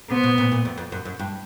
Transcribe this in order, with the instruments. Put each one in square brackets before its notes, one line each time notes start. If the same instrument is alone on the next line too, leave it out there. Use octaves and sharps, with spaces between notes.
[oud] C3 [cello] B3
[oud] B2
A#2
A#2
F2
F2
F#2
F#2
G2